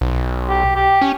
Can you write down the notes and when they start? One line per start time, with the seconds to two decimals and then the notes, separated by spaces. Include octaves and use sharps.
0.01 B1
0.49 G4
0.76 G4
1.01 C#4